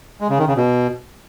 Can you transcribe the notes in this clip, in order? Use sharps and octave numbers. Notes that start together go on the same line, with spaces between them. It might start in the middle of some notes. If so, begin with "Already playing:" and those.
G#3
C#3
D#3
C#3
B2